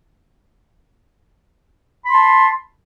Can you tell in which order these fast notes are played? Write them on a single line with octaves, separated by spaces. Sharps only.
B5 C6 A5